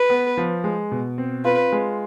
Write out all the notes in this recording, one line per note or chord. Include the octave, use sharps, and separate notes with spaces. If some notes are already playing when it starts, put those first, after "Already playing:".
Already playing: B4
B3
F3
G#3
B2
C4
F4 B4
G#3